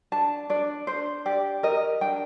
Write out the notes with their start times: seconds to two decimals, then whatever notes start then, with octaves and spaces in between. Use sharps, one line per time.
0.12 D4 A5
0.50 D4 D5
0.87 D4 C5
1.26 G4 D5
1.63 A#4 D#5
2.01 D4 G5